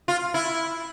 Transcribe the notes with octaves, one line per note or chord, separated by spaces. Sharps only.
F4
E4